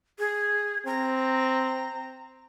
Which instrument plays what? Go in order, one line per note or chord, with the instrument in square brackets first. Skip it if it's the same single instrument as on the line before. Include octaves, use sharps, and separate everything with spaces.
[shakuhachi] G#4
[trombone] C4 [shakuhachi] A#5